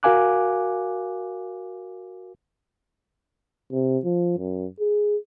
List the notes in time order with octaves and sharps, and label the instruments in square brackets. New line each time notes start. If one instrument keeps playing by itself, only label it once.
[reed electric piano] F#4 A#4 F5 G#5 D6 F#6
[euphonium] C3
F3
F#2
G#4